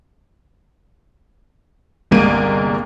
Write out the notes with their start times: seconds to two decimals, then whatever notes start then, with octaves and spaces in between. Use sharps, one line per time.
2.11 G1 C2 G#3 A#3 D7 D#7